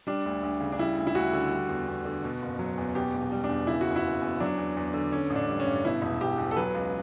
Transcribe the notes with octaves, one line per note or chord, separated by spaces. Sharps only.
G3 D4
D2
D2
C#3
D4
G3 E4
D2
E4
D2 F#4
D3
G3
E2
E2
D3
B2
F#1
F#3
E2
B2 G4
E1
G3
D4
E2
C#3 E4
F#1 F#4
E4
F#1
E2
F#3 D4
E2
E2
D3
D3 C#4
A1
D4
G3
C#4
G2
B2 E4
E1
E1 G4
E2
A4
F#3 B4
C#2